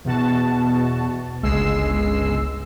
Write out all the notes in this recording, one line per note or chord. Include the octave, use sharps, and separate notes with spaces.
E2 B2 F#4 A5
G1 C#2 G#3 E6 C7